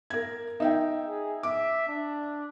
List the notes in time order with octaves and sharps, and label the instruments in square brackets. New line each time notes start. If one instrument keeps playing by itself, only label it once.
[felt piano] A#4 G#6
D#4 E5 G5
[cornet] G#4
[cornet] E5 [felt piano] D6
[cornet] D4